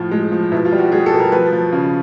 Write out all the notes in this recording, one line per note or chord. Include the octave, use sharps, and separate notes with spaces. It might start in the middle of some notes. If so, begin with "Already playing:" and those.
Already playing: A2 F3 F4
G#3
F3
B2 E4
F4
G3
F#4
G3 G#4
A4
B2
A#4
F3 B4
F3
C#3